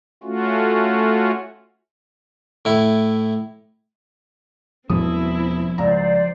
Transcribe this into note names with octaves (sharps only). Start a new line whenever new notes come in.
A3 C#4 F4 F#4
A2 E4
E1 B2 F3 G3 C4 C#4 E4 D#6
C#2 C5 D5 A#5